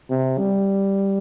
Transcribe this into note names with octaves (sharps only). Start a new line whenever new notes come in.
C3
G3